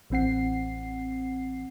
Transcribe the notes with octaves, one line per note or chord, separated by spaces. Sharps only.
A1 E3 C4 F#5 C7